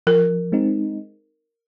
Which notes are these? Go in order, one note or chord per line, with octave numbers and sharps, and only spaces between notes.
F3 A#4
G#3 C4 D#4